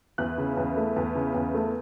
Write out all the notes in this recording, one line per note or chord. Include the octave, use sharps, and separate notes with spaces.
E2 F#6
C#3
E2
A3
E2
C#3
E2
A3